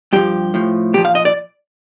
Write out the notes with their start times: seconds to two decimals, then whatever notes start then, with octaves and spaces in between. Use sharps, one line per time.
0.13 G2 F3 G4
0.54 A2 F3
0.94 A#2 G4
0.98 F3
1.05 F5
1.15 D#5
1.25 D5